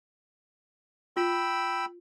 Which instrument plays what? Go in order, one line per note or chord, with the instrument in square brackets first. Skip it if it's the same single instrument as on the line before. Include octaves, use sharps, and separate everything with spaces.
[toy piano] F4 [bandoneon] G5 B5 E6